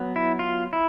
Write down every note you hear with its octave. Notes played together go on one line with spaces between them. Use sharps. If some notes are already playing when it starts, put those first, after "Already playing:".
Already playing: F#3 B3
E4
F4
E4